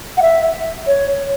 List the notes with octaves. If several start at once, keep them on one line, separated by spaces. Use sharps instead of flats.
F#5
E5
C#5